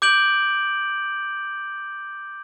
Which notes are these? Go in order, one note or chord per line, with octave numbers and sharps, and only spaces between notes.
D6 G6 D7 F#7